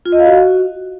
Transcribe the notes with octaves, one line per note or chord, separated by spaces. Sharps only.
F4
D#5
F5
F#4